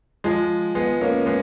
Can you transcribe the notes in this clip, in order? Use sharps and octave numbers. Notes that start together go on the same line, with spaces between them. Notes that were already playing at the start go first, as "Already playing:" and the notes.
F3 G#3
G#3 B3
A#3 C#4
G#3 B3